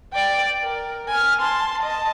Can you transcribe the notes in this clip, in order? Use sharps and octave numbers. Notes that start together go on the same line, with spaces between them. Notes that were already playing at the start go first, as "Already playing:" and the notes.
D5 G5
A#4
G#5 F6
A5 C6
D#5 A5